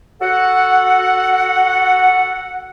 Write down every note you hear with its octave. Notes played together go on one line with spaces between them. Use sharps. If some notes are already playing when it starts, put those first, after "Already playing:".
F#4 A4 F#5